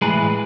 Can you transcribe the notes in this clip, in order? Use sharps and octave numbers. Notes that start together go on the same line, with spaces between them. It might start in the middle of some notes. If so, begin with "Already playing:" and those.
A2 E3 G#3 G#4 B4